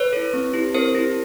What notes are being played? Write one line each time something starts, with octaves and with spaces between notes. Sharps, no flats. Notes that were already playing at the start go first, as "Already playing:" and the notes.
Already playing: B4 C#5
E4 A4
C4
E4 G4
C4 A#4 C5
E4 G4